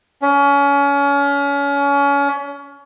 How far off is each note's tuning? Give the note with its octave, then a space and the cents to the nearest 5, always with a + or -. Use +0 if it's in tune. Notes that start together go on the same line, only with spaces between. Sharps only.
C#4 +30